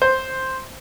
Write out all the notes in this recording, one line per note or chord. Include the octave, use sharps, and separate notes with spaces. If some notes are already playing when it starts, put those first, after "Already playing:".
C5